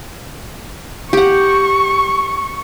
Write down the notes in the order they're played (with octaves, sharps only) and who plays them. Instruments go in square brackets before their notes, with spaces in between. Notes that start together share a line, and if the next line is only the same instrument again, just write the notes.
[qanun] G4 F#5 [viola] C#6